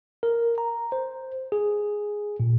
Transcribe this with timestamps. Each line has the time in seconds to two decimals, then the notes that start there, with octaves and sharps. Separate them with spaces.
0.23 A#4
0.58 A#5
0.92 C5
1.52 G#4
2.40 A#2